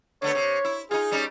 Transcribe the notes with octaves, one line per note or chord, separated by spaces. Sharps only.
D3 A3 B3 C#5
C3
E4
D#4 F4 G#4
G3 C#4 D#4